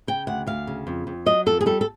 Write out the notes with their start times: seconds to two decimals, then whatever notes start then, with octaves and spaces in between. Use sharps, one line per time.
0.07 C#3 G5
0.27 D2 F#5
0.47 D2 F5
0.67 C#3
0.87 F2
1.07 F2
1.26 F#3 D#5
1.46 F2 A4
1.61 G#4
1.66 G3 A4
1.81 A4